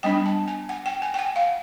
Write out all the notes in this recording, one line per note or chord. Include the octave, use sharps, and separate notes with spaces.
G3 B3 D4 G5
A5
G#5
F#5
G5
G#5
G5
F#5
F5